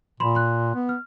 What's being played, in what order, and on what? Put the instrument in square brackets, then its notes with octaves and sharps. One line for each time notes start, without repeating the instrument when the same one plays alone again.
[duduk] A#2 [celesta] B5 C6
[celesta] C6 F#6
[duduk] B3
[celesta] F6